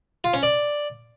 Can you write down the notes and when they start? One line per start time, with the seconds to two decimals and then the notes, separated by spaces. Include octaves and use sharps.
0.24 F4
0.34 C#4
0.43 D5